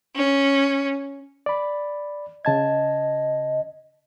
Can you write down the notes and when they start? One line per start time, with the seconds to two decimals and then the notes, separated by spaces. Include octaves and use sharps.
0.15 C#4
1.46 D5 B5
2.45 C#3 D#5 A5 G#6